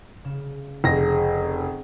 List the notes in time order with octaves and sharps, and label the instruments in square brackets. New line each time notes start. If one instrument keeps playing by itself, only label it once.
[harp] C#3 E7
[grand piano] F1 A#6 [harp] G#4 C5 F5